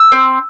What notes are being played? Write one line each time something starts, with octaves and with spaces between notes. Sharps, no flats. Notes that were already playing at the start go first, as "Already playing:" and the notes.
Already playing: E6
C4